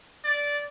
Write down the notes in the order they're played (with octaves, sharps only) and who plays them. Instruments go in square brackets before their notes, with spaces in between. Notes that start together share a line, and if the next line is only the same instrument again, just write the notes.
[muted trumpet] D5